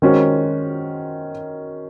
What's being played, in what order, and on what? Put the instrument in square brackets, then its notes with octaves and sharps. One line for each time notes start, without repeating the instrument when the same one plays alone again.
[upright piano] D#3 G#3 C#4 F#4 C5